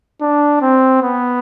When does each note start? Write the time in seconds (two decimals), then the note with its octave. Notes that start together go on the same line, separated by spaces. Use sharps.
0.21 D4
0.62 C4
1.02 B3